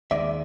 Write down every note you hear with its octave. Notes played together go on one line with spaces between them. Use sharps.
D#2 D#3 G#3 D5 E5